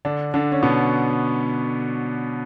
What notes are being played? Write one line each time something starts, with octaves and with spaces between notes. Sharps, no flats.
D3 D4
D3 D4
C#4
B2 B3